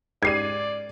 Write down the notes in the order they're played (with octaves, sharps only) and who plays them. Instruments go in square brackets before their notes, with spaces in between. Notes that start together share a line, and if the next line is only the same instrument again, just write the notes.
[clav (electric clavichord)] G#2 G4 [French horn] D5 [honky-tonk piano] G#6 C7 D#7